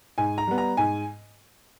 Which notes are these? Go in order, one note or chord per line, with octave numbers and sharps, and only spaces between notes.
G#2 G#5
A#5
G3 B3
A#5
G#2 G#5